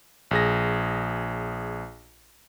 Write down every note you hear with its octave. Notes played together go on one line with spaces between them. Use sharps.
A#1 G#4 A#6